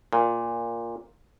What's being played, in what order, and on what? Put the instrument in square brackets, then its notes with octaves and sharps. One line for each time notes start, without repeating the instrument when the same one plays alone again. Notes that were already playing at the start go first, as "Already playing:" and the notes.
[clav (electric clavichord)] A#2